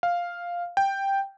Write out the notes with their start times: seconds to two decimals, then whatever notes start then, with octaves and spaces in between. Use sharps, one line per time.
0.03 F5
0.77 G5